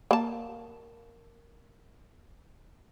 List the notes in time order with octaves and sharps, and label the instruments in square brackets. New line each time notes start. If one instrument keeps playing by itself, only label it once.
[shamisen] A#3 A5